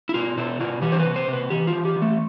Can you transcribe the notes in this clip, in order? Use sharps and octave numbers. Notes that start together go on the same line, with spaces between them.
E4
B2 F4
B2 E4
B2 F4
E3 G4
C5
B4
C3
C5
C3 B4
E3 G4
F4
E3
G4
E3
A3